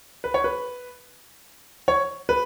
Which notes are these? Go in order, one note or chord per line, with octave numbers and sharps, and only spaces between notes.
B4
C#5
B4
C#5
B4